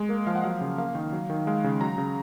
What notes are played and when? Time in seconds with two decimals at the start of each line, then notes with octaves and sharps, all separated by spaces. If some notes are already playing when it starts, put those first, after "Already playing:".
Already playing: G#3
0.09 A#3 A#4
0.27 F3 F5
0.36 F#5
0.44 F#3 F5
0.61 C#3
0.78 A#3 F5
0.95 D#3
1.13 F#3
1.30 D#3
1.47 G#3 F5
1.64 C#3
1.81 F#3 A#5
1.98 C#3